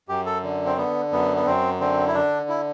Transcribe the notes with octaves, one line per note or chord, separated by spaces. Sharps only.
F#2 G4
A4
D3
C4
D3 B3
F#2 B3
B3
F#2 C4
D3 C4
E4
D3 D4
E4